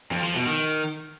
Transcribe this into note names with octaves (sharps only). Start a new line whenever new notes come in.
F2
F3
B2
D#3